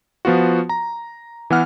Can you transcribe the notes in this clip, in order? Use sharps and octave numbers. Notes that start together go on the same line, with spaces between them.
F3 B3 F4 F#4
A#5
E3 B3 F#5 F6